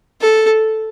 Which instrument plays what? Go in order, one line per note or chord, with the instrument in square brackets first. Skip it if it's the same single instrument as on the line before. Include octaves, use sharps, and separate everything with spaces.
[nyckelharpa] A4